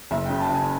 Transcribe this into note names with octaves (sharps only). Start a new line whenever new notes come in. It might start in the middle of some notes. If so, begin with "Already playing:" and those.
F#1 E5
G5
C#3
A5
C#3 G#5